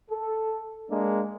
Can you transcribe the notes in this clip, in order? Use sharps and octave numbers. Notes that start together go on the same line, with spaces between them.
A4
G#3 A#3 D4